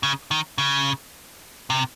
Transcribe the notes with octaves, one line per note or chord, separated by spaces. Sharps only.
C#3
D#3
C#3
C3